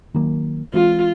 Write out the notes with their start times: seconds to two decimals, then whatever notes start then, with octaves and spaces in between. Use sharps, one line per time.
0.14 D#3 F#3 A#3
0.73 E3 G#3 C4 F4